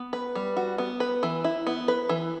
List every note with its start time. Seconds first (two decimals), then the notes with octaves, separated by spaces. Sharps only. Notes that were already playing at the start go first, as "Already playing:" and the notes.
Already playing: B3
0.13 B4
0.35 G3
0.57 F#4
0.78 B3
1.00 B4
1.23 E3
1.44 E4
1.67 B3
1.88 B4
2.09 E3